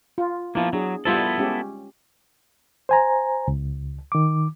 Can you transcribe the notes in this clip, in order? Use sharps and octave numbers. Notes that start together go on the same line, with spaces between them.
F4
F3 A#3 B3 E4
F#3 D4 G#4
G3 B3 E4 F4 A4 C5
G#3 C#4 G4
C5 G#5 A#5
C#2
D#3 D6